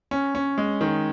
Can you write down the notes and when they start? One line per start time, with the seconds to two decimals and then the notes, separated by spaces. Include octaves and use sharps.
0.11 C#4
0.35 C#4
0.58 G#3
0.81 D#3